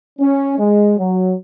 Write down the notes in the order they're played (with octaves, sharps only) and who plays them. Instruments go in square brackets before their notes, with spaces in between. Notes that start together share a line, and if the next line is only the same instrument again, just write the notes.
[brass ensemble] C#4
G#3
F#3